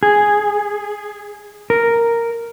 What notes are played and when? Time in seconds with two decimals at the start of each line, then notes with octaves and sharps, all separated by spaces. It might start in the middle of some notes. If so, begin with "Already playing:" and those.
0.03 G#4
1.70 A#4